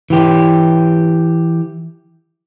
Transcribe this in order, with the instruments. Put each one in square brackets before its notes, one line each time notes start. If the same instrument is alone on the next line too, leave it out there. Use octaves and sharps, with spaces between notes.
[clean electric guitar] E3 G4